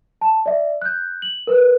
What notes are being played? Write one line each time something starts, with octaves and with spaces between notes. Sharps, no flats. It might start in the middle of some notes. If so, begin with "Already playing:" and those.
A5
D5 E5
F#6 G6
F#7
A#4 B4